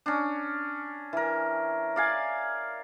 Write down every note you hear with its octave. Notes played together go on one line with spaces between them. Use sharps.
C#4 D4
E3 A#4
D5 F5 G#5